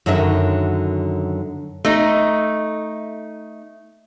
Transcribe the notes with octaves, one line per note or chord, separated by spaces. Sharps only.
F#2 D3 D#3 F#3 E5
A3 D#4